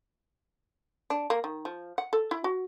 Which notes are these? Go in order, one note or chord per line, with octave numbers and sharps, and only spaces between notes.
D4
A#3
D#3
F3
F#5
A4
E4
F#4